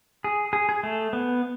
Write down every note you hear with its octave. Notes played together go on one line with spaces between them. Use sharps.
G#4
G#4
G#4
A3
B3